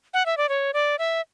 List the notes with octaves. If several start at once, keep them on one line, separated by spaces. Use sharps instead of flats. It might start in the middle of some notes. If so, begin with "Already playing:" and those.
F#5
E5
D5
C#5
D5
E5